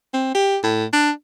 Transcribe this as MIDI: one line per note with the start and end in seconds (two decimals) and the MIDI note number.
0.13 0.30 60
0.35 0.58 67
0.64 0.85 45
0.93 1.10 62